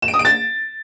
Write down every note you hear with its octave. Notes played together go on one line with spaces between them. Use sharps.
E7
D7
D#6
D7
A6